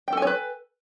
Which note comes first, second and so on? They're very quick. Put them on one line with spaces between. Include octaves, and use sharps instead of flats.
G5 A4 G#5 C#5 B4